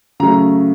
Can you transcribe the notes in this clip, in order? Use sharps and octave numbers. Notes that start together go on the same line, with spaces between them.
C#3 F#3 A3 A#5